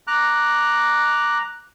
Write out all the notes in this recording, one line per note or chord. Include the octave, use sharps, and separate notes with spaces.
A#5 D6 F#6